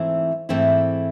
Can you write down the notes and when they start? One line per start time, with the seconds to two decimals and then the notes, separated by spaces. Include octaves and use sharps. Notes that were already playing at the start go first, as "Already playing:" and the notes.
Already playing: G#2 E3 A3 C4 E4
0.49 G#2 E3 A3 C4 E4